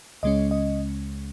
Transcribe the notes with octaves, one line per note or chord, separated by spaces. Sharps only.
C#2 C#3 G#3 C#4 D#5
D#5